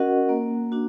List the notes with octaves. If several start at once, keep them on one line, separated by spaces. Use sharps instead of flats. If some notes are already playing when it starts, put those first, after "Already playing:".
Already playing: C#4 F#4 A#4 D#5 F#5
A#3
D4 F#4